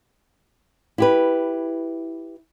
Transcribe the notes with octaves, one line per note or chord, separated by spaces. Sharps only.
E4 G4 B4